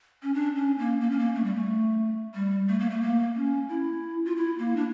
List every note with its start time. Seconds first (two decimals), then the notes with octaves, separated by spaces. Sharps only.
0.23 C#4
0.34 D4
0.56 C#4
0.79 A#3
1.01 A#3
1.11 C#4
1.19 A#3
1.35 A3
1.44 G3
1.55 A3
2.35 G3
2.68 A3
2.79 A#3
2.90 A3
3.02 A#3
3.36 C#4
3.69 E4
4.25 F4
4.36 E4
4.59 A#3
4.76 D4